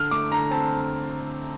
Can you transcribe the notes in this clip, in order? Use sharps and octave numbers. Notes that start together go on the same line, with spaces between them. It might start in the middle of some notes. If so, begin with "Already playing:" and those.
Already playing: D3 F6
A3 D6
D3 A#5
C4 A5